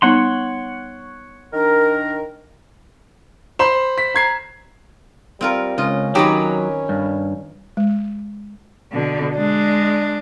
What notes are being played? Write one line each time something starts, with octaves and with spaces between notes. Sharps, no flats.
G3 B3 D#4 C#5 F#5 C6
D#3 D4 A#4
C5 B5 C6 E7
B6
A#5 G#6 C7
G3 C4 F4 A#4
C#2 C#4 F4 D#5
D#3 F#3 D#4 G4 B4 C#5
G2
G#3
B2 D3
G#3 D4